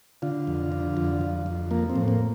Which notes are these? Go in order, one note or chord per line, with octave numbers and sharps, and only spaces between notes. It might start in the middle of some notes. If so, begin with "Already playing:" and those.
D3 F4
F2
D3
F2
F2
F2
F3 A#3
C4
A2
A#3